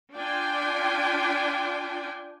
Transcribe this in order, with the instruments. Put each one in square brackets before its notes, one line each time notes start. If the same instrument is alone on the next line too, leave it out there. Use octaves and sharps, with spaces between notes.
[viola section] D4 F4 G5 G#5